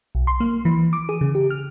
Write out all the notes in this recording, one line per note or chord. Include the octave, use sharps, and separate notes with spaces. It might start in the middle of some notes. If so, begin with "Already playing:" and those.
B1
C6
A#3
E3
D6
G#4
C#3
G4
F6